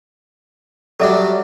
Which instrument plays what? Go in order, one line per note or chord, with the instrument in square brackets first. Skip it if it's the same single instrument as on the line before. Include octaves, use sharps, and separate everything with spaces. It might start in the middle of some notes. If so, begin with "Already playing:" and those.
[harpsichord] F#3 G3 D4 [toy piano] A4 D5 E5